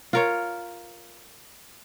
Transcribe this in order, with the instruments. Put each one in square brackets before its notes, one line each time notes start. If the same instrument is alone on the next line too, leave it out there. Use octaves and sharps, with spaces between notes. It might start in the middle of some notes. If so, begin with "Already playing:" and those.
[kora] F4 A#4 C#5